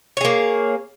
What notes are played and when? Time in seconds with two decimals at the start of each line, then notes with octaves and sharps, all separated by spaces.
0.17 C#5
0.21 G#4
0.25 A#3